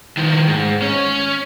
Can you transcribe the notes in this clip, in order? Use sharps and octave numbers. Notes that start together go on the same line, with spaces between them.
D#3 F3
G#2
C#4